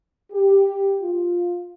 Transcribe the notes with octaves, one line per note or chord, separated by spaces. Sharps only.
G4
F4